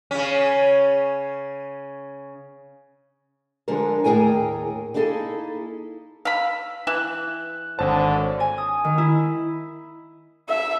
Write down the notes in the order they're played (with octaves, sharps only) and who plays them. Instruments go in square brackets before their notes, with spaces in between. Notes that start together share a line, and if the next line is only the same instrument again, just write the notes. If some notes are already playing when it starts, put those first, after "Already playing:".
[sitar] C#3 C#4
[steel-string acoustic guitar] D3 F3 G#3 A4 A#4
D#2 A2 G#4 A#4 G5 G#5
A#3 D#4 E4 G#4 A4
[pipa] F5 B5 [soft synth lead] E6
[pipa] E3 E5 [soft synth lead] F#6
[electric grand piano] G#1 C#5 A5 [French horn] D3 [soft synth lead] C5
[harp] G#5
D#6
D#3
E4
[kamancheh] E5